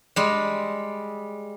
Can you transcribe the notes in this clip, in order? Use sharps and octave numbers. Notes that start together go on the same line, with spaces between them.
G3 G#3